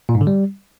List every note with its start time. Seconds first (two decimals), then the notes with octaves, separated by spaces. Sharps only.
0.09 A#2
0.15 G#2
0.21 D3
0.27 G3